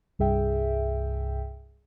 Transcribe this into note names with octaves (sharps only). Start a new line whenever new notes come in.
C2 G2 G#4 E5 G5